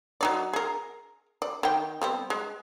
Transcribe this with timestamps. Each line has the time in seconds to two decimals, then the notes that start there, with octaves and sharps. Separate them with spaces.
0.21 F#3 D#4 D5
0.53 G#4 A#4
1.42 D5
1.63 D#3 G5
2.02 G3 B3 C4
2.30 G#3